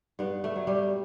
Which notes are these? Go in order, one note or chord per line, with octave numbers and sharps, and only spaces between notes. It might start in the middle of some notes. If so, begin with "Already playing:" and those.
G2 B3
A3
F#3
G3